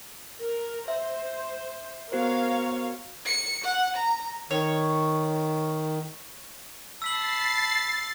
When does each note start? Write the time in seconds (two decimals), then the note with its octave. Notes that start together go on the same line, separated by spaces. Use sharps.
0.40 A#4
0.88 C5 E5
2.12 B3 F#4 A#4 C5 C#5 F5
3.26 C#7
3.64 F#5
3.96 A#5
4.51 D#3 C#5
7.02 A5 B5 E6 A6 B6 C7 F#7